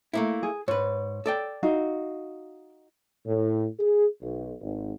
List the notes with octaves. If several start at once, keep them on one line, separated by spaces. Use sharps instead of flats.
A3 A#3 E4
G#4
G#2 B4 C#5
A4 D5 G5
D#4 F#4 F5
A2
G#4
B1
G#1